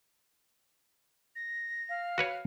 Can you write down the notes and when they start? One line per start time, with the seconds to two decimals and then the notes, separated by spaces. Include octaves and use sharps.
1.36 A#6
1.89 F5
2.18 F#4 B4 C#5